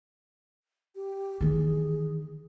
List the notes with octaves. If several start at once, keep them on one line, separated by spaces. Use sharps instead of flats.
G4
D#3 E3 G#4